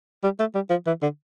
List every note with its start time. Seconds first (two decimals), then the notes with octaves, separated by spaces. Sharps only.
0.24 G3
0.40 A3
0.55 G3
0.70 F3
0.87 E3
1.02 D3